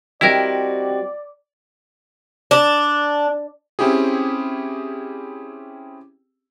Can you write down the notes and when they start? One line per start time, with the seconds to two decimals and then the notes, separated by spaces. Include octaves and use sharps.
0.21 G3 C4 E4 F#4 A#4 D5 D#5 G5
2.51 D4
3.79 C4 C#4 E4 G4 G#4